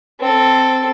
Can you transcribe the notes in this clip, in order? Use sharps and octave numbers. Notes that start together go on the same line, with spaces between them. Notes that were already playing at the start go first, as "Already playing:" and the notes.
C4 A4